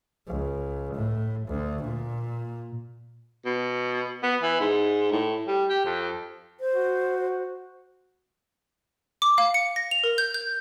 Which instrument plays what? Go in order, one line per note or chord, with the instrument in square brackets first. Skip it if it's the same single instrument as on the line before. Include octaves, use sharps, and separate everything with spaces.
[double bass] C#2
A2
D2
A#2
[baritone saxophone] B2
B3
E3
G#2
A2
G3
G4
F2
[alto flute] C5
[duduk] F#4
[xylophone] D6
F5
C#7
A#6
F7
A#4
G6
G6